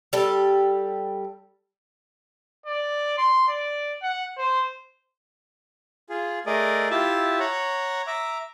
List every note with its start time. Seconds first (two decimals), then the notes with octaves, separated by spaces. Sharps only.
0.13 G3 A4
2.66 D5
3.18 C6
3.48 D5
4.03 F#5
4.38 C5
6.10 F4 G#4
6.46 A3 G#4 A#4 D5 D#5
6.91 E4 F4 G4 E5 A5
7.40 C#5 F#5 A#5
8.07 E5 A#5 D6